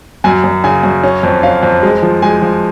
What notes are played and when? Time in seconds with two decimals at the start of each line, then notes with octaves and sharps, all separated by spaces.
0.24 F#2 G#5
0.44 F#2
0.64 C#3 G#5
0.83 F#2
1.03 C#4
1.23 F2
1.43 C#4 F5
1.63 F2
1.83 G#3
2.03 F3
2.22 G#3 G#5
2.42 F3